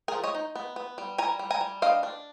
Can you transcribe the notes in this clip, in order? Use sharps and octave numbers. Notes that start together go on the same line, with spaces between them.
G#4 A#4
F3
C#5 D#5
D#4
B3
B3
G3
G3 G#5 A#5
G3
G#5 A#5
G3
D4 D#5 F5
D4